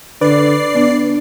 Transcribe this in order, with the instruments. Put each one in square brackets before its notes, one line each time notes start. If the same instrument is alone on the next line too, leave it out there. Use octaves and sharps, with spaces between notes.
[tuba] D3 [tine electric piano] B4 [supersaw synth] D5 C7
[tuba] B3 [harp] D4